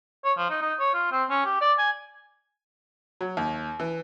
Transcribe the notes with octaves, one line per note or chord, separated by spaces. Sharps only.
C#5
F3
D#4
D#4
C#5
F4
C4
C#4
G4
D5
G#5
F#3
D#2
E3